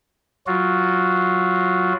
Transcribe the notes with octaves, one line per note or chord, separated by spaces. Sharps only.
F#3 F4 F#4